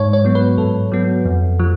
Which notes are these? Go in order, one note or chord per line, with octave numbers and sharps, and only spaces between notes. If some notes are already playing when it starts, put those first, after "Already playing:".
Already playing: G#2 C#5
C#5
F#3 B3
B4
G#2 A4
F#3 B3
F2
F3